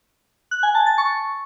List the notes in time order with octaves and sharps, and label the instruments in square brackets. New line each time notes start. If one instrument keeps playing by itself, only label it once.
[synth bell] F#6
G#5
A5
A6
C#6